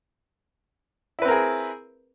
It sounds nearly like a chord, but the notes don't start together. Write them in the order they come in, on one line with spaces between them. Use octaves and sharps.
E4 B4 C4 A#4 G#4